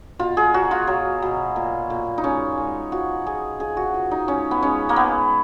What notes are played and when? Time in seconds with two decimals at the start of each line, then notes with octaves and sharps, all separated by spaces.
0.19 B2 F4
0.37 G#4
0.54 F#3 F#4
0.71 F4
0.87 F#3
1.22 B2
1.56 A#2
1.90 A#2
2.18 D#4
2.24 G#3 C#4
2.57 G#3
2.92 F3 F#4
3.26 F3 G#4
3.60 F3 G#4
3.77 F#4
3.94 F3
4.11 D#4
4.28 G#3 C#4
4.51 B3
4.62 G#3 C#4
4.89 A#3
4.96 G#3 B3